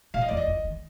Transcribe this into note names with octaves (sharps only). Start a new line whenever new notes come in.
B2 F5
D#5
F2 D5
D#5
F2
D#3